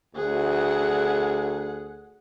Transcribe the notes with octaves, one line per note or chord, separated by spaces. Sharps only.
D2 G#4 F#5